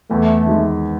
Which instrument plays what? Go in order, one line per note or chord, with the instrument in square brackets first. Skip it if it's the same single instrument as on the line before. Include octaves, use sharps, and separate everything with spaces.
[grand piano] E2 [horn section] A3
[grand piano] D#3 G#3